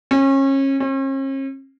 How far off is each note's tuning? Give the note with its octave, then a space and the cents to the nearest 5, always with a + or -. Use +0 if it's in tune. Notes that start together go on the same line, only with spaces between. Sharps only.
C#4 -30
C#4 -45